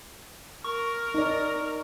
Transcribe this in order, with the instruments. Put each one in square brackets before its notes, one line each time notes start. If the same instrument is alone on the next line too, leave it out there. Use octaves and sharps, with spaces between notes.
[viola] A#4 [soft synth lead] C#6
[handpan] D#4 D5